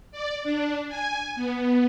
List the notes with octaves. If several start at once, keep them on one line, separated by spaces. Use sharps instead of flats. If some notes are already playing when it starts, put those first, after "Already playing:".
D5
D4
G#5
B3